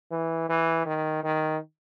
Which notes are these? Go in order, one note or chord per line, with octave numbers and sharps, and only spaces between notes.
E3
E3
D#3
D#3